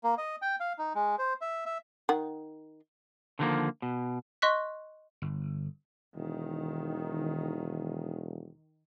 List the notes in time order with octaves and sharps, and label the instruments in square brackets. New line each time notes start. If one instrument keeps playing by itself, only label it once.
[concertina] A#3
D#5
G5
F5
D#4
G#3
C5
E5
E5
[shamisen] D#3 F#5
[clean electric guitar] D3 D#3 F3 G#3 A#3
B2
[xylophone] D#5 C6 C#6 F#6 B6
[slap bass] G1
[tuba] E1 [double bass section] D#3